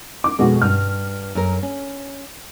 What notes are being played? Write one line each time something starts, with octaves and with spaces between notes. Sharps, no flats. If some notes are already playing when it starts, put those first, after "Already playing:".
D6
F2 B2 G#3 F#4
G2 F6
F#2 A#4
C#4